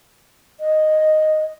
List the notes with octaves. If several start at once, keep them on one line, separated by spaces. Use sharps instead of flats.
D#5